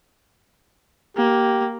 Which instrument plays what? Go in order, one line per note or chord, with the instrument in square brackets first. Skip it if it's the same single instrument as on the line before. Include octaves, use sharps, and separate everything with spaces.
[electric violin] A#3 [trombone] G4